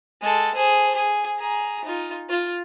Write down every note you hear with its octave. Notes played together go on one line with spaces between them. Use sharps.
G#3 A4
G#4 C5
G#4
G#4 A#5
D#4 F4
F4